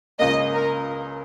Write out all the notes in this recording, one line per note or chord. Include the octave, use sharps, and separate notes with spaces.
C#2 C#3 A#3 D#5
A#4